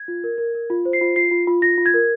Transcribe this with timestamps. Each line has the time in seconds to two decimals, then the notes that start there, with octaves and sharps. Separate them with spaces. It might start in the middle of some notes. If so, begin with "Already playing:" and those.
Already playing: G#6
0.08 F4
0.24 A#4
0.38 A#4
0.55 A#4
0.70 F4
0.85 C5
0.93 C7
1.01 F4
1.16 F4 C7
1.31 F4
1.47 F4
1.62 F4 A#6
1.78 F4
1.86 G#6
1.94 A#4